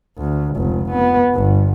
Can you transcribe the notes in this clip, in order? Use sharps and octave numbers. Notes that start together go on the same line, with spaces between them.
D2
F1 C#2
B3
G1